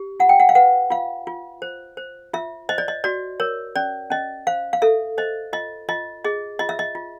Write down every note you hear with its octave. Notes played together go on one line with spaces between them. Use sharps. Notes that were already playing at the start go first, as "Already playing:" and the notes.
Already playing: G4
F4 F#5
G5
F#5
F5
B4 F#5
F4 F5
F4
C5
C5
F4 E5
C5 D#5
D5
D#5
F#4 D5
A#4 C#5
C#4 D5
C#4 D#5
C5 F5
F5
A4 E5
C5 D#5
F4 D#5
F4 D#5
G#4 D#5
F4 D#5
E5
D#5
F4